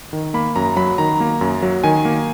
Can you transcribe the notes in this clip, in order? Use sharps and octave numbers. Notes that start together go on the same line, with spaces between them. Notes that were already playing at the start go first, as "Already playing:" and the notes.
D#3
A#3 B5
F#2 A#5
F#3 B5
D#3 A#5
A#3
F#2
F#3
D#3 G#5
A#3